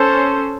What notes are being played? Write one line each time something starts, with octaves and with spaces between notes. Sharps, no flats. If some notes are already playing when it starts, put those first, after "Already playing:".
Already playing: C#4 A4 C5